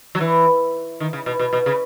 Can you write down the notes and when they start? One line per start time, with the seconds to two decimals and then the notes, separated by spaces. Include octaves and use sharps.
0.15 F#3
0.21 E3
1.00 D#3
1.13 C#3
1.26 B2
1.39 B2
1.53 B2
1.66 C#3